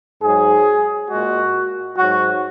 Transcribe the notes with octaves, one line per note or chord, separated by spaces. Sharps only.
G#2 F#3 G#4
A#2 G#3 F#4
G#2 F#3 F#4